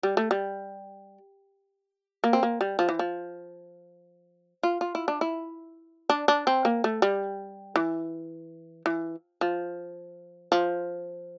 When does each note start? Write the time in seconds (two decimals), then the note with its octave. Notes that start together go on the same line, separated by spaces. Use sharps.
0.03 G3
0.17 A3
0.31 G3
2.24 A#3
2.33 C4
2.43 A#3
2.61 G3
2.79 F3
2.89 E3
2.99 F3
4.63 F4
4.81 F4
4.95 E4
5.08 D4
5.21 E4
6.10 D4
6.28 D4
6.47 C4
6.65 A#3
6.84 A3
7.02 G3
7.76 E3
8.86 E3
9.41 F3
10.52 F3